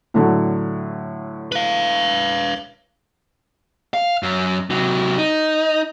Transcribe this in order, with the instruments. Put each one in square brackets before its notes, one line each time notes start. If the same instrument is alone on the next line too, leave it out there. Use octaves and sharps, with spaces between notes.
[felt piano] A2 D3 F#3
[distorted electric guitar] B4 F5
[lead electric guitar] F5
F#2
C3 F#3
D#4